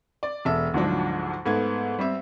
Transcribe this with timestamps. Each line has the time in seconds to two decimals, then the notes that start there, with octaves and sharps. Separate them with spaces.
0.23 D5
0.45 E1 A4 E5
0.74 D2 G#2 F3 F#3 D4
1.46 G#2 A3 B3 G#6
1.99 G3 C4 E5